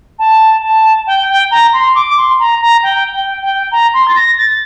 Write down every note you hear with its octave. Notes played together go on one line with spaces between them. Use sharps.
A5
A5
G5
G5
A#5
C6
D6
C6
A#5
A#5
G5
G5
G5
A#5
C6
A6
A#6
A6